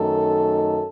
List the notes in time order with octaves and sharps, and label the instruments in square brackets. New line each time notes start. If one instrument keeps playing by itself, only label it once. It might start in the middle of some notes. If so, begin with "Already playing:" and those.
Already playing: [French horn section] F#2 D#3 A3 D#4 A4